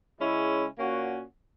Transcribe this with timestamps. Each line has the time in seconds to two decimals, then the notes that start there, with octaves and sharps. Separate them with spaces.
0.20 C#3 G#3 C#4 E4
0.77 A#2 A#3 C#4 F#4